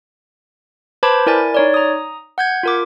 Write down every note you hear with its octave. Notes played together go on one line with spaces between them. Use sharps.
B4 C5 A5 B5 D6 G#6
E4 A#4 D5 G#5 A6
D#4 C#5 D5
A#5 D#6
F#5 G6 G#6
F4 A#4 D6